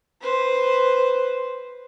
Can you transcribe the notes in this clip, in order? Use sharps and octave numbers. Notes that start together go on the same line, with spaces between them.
B4 C5